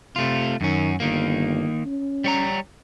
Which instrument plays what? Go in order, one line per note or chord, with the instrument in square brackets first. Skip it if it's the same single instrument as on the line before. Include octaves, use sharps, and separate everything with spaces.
[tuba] C3 [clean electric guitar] A3 F4
[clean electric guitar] F#2 C#4 [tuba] D#3
[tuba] G1 [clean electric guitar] D#3 A#3
[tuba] C#4
[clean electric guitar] G3 C#5 A#5